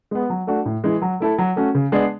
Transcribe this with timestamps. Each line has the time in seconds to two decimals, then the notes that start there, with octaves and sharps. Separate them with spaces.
0.11 G#3 B3
0.30 F#3
0.47 A3 D4 F#4
0.65 A2
0.84 E3 G#3
1.02 F#3
1.20 A3 E4 A4
1.38 F#3
1.56 A3 C#4 F#4
1.75 C#3
1.92 G#3 B3 D4 G#4